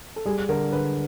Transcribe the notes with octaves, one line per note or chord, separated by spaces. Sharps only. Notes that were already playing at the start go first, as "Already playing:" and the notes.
A4
G3 G#4
D3 A#4
D3 B4